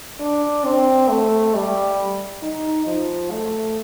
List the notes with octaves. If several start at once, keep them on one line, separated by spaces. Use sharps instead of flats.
D4
C4
A3
G3
D#4
F3
A3